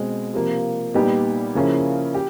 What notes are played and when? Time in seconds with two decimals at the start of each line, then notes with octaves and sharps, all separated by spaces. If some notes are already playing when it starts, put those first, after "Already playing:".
Already playing: B2 G#3 C4
0.34 C3 F3 A#3
0.94 A#2 G3 B3 D#4 G4
1.55 C#3 F3 A#3 C#4 E4
2.14 G4